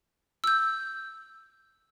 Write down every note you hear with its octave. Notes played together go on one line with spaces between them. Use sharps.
E6 G6